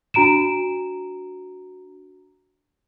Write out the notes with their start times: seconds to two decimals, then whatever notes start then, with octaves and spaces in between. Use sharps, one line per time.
0.14 D4 F#4 A#5 D7 E7